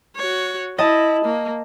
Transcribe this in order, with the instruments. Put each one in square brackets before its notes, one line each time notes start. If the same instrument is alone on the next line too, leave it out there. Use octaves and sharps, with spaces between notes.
[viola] F#4 C#5
[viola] E4 [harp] D#5 A5
[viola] A#3